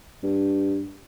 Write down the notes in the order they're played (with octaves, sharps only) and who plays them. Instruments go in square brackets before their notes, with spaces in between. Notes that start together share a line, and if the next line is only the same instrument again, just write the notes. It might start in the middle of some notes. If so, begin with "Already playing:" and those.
[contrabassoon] G2